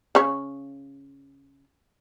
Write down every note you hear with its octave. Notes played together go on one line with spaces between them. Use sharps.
C#3 C#5